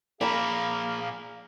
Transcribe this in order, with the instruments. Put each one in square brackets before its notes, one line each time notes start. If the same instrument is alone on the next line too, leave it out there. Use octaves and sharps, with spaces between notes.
[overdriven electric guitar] A#2 F3 [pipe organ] A#3 [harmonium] G#4 F5 [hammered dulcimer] A#5 B5